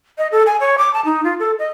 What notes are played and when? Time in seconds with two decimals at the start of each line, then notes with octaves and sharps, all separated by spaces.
0.18 D#5
0.32 A4
0.46 G#5
0.60 C#5
0.78 D6
0.94 A5
1.05 D#4
1.24 F4
1.39 A4
1.59 D#5